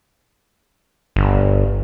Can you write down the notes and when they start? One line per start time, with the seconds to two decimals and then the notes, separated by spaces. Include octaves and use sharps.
1.16 G1